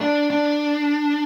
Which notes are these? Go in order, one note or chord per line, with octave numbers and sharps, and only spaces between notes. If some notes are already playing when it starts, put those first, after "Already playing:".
D4
D4